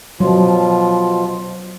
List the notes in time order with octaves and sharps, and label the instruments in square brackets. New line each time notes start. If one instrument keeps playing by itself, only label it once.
[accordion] B2 F3 F4 [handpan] F#3